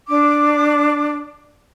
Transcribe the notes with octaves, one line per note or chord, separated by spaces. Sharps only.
D4 D6